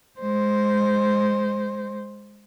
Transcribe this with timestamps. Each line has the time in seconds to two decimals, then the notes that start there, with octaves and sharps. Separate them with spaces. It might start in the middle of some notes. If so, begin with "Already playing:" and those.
0.20 G#3 C5